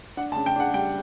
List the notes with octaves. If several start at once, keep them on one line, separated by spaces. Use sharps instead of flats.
D4 F#5
A5
C#3
G5
D4 F#5
G3 G5